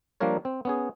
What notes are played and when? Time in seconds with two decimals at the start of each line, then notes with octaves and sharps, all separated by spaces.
0.20 F3 G3 A#3 D4 A#4 C#5
0.45 C4
0.65 B3 C#4 G#4